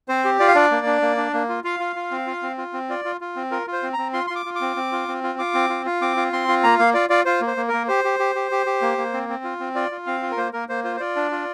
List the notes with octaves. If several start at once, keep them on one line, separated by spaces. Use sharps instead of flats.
C4 C5
G4
F4 D5
F5
D4 D5
A#3
D4
A#3
D4
A#3
F4
F4 F5
F4
F4
C4
F4
C4
F4
C4
F4 D5
F4
F4
C4
F4 A#4
F4
C5
C4
C4 A#5
F4 C6
C6
F4
D6
F4
D6
C4
C4
F4
C4
F4
F4 D6
C4
F4
F4
C4 D6
F4
C4 C6
F4
A#3 A#5
A#3 F5
F4 D5
F4 D5
F4 C5
A#3
C5
A#3
A#4
A#3
G4 C5
G4
G4
G4
G4
G4
A#3
A#3
C4
C4
F4
C4
F4 D5
F4
C4 F5
F4
A#4
A#3 C5
A#3 A#4
A#3 C5
F4 C5
C5
F4 D5
D4
F4